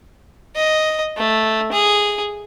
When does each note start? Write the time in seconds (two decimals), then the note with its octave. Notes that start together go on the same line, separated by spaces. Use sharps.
0.56 D#5
1.17 A3
1.72 G#4